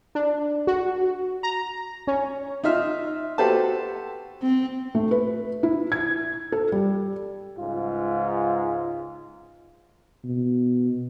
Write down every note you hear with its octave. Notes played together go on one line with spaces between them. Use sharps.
D4
F#4
A#5
C#4
D#4 F4 E5 F6
F#4 G4 A4 B4 C5 A5
C4
A3
B4
E4
G#6
A4
G3
C#2 G#2 F4
B2